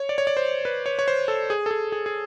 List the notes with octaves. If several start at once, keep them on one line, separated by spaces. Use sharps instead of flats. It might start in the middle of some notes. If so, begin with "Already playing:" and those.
Already playing: C#5
D5
C#5
D5
C5
B4
C#5
C#5
C5
A4
G#4
A4
G#4
G#4
G#4